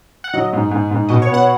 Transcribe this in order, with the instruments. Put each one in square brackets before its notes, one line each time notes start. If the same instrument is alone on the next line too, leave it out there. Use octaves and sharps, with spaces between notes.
[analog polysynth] F#5
[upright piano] F#3 [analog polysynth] D#5
[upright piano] G#2
G#2
G#2
[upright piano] B2 [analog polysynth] D#5
[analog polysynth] C#5
[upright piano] B3
[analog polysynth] F#5